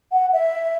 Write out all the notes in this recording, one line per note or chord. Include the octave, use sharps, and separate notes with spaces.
F#5
E5